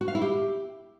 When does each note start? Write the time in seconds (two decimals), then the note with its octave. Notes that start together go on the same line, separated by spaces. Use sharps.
0.01 F#4
0.08 F5
0.15 E4
0.22 G4